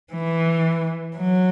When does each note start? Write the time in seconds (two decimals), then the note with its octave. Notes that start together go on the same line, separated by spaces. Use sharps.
0.13 E3
1.17 F#3